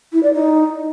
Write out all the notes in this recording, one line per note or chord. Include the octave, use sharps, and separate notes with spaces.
E4
D5
D#4